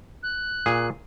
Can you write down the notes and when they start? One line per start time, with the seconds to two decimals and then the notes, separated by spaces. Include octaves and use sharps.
0.23 F#6
0.66 A#2 G#4